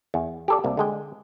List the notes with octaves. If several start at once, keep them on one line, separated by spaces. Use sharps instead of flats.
E2
G4 A4 D5
C2 A#3
D3 G#3 G5